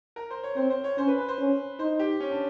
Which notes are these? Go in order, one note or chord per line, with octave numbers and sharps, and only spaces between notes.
A#4
C5
C#5
C4 C5
C5
C#5
C#4 C5
B4
B4
C5
C#4
D#4 C5
G4
C#4
D4